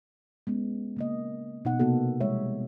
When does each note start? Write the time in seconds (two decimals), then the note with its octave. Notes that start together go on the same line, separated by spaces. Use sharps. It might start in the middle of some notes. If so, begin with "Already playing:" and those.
0.47 G#3 B3 C#4
0.96 C#3 A#3 D#5
1.65 B2 D#4 F#5
1.80 C3 A#3 B3 F#4 A4
2.21 F3 G3 G#3 C#5 E5